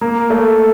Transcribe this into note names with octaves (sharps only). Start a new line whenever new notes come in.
A#3
A3